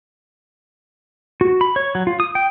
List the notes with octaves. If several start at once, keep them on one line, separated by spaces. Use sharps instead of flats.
F#4
B5
C#5
F#3
F4
D#6
G5